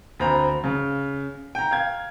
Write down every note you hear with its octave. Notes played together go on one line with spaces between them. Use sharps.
D2 C4 C5 A#5 B5 F7
C#3
G5 A#5
F5 G#6